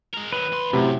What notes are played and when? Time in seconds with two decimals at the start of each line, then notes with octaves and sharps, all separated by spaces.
0.14 G#3 A#4
0.32 D#3 F#3 B4
0.52 D2 C6
0.73 F#2 A2 C3 F#3